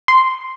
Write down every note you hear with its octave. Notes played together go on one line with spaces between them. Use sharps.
C6